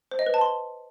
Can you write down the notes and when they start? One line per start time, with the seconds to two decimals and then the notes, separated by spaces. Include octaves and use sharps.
0.11 C5
0.19 D#5
0.26 B4
0.34 A5
0.41 C6